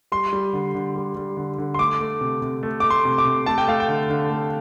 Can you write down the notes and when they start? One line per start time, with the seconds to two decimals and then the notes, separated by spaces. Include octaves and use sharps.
0.12 G3 C6
0.33 G3
0.53 D3
0.75 D3
0.95 G3
1.16 G3
1.37 D3
1.58 D3
1.75 C6
1.79 A3 D6
2.00 A3
2.21 C3
2.42 C3
2.63 A3
2.80 A3 D6
2.90 C6
3.05 C3
3.18 D6
3.25 C3
3.46 A3 A5
3.58 G5
3.68 A3 F5
3.80 G5
3.88 D3
4.09 D3
4.30 A3